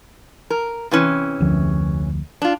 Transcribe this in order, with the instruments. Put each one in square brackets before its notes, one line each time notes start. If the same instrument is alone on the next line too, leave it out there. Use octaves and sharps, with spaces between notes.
[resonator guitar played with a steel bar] A#4
C3 E3 C#4
[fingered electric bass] F1 D2 F3
[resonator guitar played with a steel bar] D4 F4